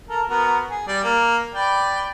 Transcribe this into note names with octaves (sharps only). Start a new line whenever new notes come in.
A4 A#4
B3 F#4 A#4
G#4
G3 D5
A#3
B4 D5 G5